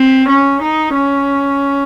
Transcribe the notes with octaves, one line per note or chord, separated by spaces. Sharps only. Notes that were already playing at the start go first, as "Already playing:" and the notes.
Already playing: C4
C#4
D#4
C#4